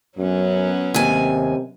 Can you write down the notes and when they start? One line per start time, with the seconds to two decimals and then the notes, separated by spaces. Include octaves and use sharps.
0.18 F#2 F#3 B3 C#4
0.94 D#2 C3 G#5